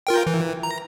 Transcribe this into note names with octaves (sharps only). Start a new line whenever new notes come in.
F4 A#4 G5
E3
A#5